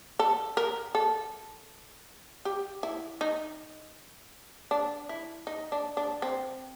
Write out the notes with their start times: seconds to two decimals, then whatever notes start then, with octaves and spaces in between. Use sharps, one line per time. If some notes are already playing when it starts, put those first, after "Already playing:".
0.19 A4
0.57 A#4
0.95 A4
2.45 G4
2.83 E4
3.21 D#4
4.71 D4
5.09 E4
5.47 D#4
5.72 D4
5.97 D4
6.22 C4